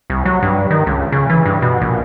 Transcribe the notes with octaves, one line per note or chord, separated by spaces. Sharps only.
C2
F#3
G2
D#3
C#2
C#3
E3
G2
B2
A#1